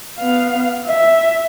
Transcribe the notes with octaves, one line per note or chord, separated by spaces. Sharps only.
B3 F5
E5